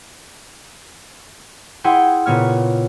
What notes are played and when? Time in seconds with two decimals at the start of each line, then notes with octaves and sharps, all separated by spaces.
1.84 E4 G#4 F#5 G5 C6
2.26 A#2 C#3 B3 C#5 F6